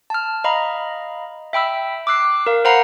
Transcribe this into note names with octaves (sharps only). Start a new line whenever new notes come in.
A5 F6
D#5 F5 A#5 B5
E5 G5 B5 E6
D6 E6 F#6 C7
A#4 F5
C5 F5 F#5 A#5 B5 C7